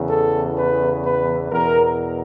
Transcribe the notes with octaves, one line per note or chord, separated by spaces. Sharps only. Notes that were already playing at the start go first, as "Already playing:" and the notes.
Already playing: E2 C#3 E3
A4
B4
B4
E2 B2 A#4